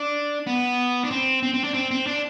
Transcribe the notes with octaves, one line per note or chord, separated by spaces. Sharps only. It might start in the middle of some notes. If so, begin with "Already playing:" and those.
Already playing: D4
B3
D4
C4
C4
C4
D4
C4
C4
D4